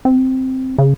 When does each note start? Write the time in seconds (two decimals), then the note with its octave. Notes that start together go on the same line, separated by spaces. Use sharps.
0.05 C4
0.78 C#3